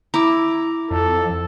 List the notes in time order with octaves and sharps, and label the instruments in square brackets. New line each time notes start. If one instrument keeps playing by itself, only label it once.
[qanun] E4 [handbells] A#5 D6
[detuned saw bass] F2 [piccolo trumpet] A4